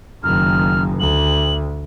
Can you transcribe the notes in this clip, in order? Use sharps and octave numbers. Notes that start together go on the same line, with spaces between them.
F#1 D#3 F6
D2 F#7